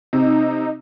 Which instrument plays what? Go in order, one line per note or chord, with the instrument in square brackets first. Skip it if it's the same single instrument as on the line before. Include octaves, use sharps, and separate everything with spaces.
[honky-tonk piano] C3 [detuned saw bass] D#4